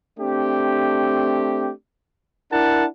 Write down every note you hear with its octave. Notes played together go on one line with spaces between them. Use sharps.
A3 C4 D4 G4
D4 E4 A#4 F#5 A5